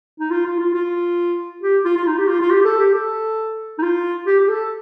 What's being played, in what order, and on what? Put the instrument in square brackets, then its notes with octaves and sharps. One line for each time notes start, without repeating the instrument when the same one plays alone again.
[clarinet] D#4
F4
F4
F4
F4
G4
F4
F4
D#4
G4
F4
F4
G4
G4
A4
G4
A4
D#4
F4
G4
G4
A4